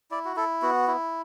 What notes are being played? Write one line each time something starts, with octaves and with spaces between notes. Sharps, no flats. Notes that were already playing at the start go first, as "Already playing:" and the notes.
E4 D5
F#4
E4 A4
B3 F#4
E4